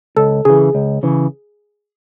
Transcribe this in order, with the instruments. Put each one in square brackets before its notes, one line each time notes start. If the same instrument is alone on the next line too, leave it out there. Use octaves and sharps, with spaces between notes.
[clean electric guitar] C#2 [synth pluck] A4
[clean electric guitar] C#3 E3 [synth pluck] G#4
[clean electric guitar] C#2
C#3 E3